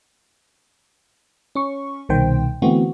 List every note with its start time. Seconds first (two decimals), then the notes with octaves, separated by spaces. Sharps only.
1.55 C#4 C#6
2.09 C2 B2 D#3 C5 G5
2.62 D3 E3 A3 B3 C4 F#4